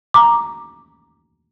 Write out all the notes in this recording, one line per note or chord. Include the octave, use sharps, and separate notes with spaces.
A#5 D6